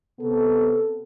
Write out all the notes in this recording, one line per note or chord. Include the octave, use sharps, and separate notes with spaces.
C3 B3 A4